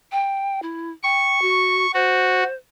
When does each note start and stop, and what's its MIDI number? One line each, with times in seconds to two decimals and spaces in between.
0.12 0.62 79
0.62 0.91 64
1.03 1.40 79
1.03 1.91 85
1.42 1.86 66
1.94 2.44 66
1.94 2.54 72